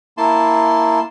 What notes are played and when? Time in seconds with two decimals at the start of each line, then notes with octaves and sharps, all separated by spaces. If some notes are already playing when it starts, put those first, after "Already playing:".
0.17 A#3 E4 A5 C6